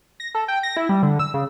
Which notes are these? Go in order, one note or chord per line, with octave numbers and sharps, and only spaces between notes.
A#6
A4
G5
A#6
E4
G3
D3
E6
C#3